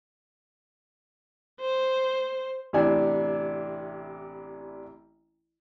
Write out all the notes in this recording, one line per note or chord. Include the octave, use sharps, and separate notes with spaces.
C5
A1 C3 E3 D4 G#5